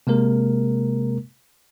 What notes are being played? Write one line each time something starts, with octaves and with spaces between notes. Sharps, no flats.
C3 G#3 A#3 A#4